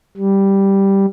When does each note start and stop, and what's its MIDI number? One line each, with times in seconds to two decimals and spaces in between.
0.17 1.06 55